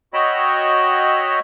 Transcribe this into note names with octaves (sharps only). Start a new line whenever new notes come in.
F#4 C#5 D#5 G5 B5 E6